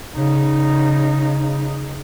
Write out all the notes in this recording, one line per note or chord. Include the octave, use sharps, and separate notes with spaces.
C#3 D#4